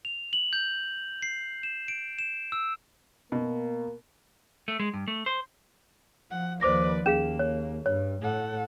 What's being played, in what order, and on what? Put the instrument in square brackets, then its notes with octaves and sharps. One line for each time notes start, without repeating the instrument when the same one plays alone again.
[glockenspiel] F7
F#7
G6
C7
E7
D7
E7
E6
[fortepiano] B2 [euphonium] A#3
[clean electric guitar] A3
G#3
G2
A3
C5
[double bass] F3 [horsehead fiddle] F#5
[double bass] D#2 F3 [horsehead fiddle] B4 D5 [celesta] C5 D6 A#6
[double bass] D#2 [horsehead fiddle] A#3 [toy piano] C#4 G#4 F5 [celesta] E7
[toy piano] C#5
[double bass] G2 [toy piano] C#5
[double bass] A2 [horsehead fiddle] A4 F#5